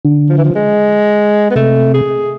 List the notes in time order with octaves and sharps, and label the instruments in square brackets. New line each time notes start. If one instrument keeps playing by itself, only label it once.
[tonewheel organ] D3
[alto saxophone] F3
E3
F3
G#3
B3
[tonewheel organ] C3 [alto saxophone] A3
[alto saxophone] G#4